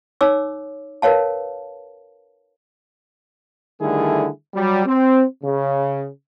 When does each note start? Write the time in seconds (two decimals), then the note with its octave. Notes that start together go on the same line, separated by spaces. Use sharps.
0.21 D#4 C#5 D6 E6
1.02 A#4 B4 C#5 F5 A5
3.81 D3 D#3 G3 A3 E4 G#4
4.55 F#3 G3
4.86 C4
5.44 C#3